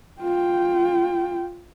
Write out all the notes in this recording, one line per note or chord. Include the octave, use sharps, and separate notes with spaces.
F4 G5